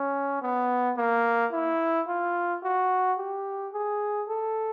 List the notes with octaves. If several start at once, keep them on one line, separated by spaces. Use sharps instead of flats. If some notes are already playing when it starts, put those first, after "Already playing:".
Already playing: C#4
B3
A#3
E4
F4
F#4
G4
G#4
A4